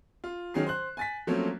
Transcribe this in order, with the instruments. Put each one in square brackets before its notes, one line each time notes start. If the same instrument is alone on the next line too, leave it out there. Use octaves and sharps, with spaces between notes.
[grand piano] F4
D#3 F#3 C#4 G#4 C7
C5 F#6
G#5 A6 B6
F3 F#3 A3 A#3 C4 C#4